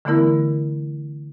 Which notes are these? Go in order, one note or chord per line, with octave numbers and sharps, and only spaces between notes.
D3 E3 A3 B3 E4 A#4